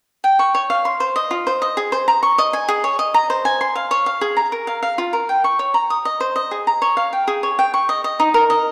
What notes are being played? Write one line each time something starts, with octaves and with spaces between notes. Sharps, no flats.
G5
C#6
C#5
F5
C6
C5
D#5
F4
C5
D#5
G#4
C5
A#5
C#6
D#5
G#5
G#4
C#5
D#5
A#5
C5
G#5
C6
F5
C#5
F5
G#4
A#5
A#4
F5
F5
F4
A#4
G5
C#6
C#5
A#5
D#6
D#5
C5
D#5
G#4
A#5
C#5
F5
G5
G#4
C#5
G5
C#6
D#5
D#5
D#4
A#4
D#5